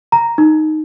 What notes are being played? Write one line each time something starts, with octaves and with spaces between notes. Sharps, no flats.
A#5
D#4